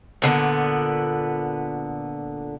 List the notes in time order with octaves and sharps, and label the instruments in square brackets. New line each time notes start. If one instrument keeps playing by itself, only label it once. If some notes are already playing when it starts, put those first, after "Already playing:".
[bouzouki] A#2 D3 B3